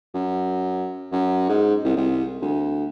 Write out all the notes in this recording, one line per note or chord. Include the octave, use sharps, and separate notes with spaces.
F#2
F#2
G#2
C2
C2
D2